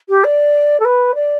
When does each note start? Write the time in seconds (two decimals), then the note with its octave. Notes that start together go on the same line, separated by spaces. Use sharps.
0.09 G4
0.24 D5
0.79 A4
0.84 B4
1.14 D5